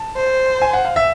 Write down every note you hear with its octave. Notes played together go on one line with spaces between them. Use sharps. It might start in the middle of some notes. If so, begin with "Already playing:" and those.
Already playing: A5
C5
G#5
F#5
F5
E5